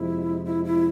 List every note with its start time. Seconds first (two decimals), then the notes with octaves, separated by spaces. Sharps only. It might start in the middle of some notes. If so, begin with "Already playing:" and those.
Already playing: F2 C3 F3 G#3 E4
0.45 E4
0.65 E4